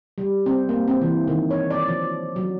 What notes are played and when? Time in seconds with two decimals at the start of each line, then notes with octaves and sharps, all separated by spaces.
0.18 G3
0.46 C4
0.69 A#3
0.88 C4
1.02 E3
1.27 D#3
1.51 C#5
1.71 D5
1.88 F3
2.36 F#3